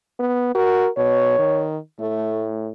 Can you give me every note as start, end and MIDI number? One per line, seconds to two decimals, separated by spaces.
0.19 0.52 59
0.55 0.88 66
0.55 0.89 70
0.97 1.38 47
0.97 1.67 73
1.38 1.77 51
1.99 2.72 45
1.99 2.46 57